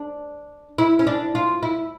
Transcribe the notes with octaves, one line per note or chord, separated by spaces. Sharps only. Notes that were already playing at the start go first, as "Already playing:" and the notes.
Already playing: D4
E4
C#4
D4
F4
E4